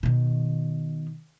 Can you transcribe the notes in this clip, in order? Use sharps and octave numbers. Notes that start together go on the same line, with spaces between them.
B2 D#3